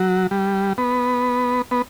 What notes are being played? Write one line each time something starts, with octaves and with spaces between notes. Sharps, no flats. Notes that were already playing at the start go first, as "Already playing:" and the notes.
Already playing: F#3
G3
B3
B3